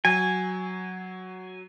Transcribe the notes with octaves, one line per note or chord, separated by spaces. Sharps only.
F#3 G#5